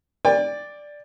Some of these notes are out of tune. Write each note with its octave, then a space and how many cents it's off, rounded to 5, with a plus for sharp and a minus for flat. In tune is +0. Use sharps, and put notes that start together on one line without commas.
D5 +0 G5 +35